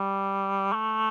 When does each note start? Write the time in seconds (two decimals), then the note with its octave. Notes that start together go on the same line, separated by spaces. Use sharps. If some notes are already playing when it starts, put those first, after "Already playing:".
Already playing: G3
0.73 A3